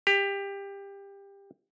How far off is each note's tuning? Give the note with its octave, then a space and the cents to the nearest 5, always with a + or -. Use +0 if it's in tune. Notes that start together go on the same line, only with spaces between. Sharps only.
G4 +20